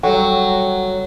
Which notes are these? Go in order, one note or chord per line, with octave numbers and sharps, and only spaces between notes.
F#3 G3 A4 F#5 G5 C#6